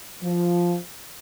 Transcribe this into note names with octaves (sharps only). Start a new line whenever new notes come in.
F3